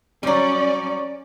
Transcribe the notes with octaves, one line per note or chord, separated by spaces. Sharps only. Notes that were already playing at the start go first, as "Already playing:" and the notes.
F#3 G3 C#4 D5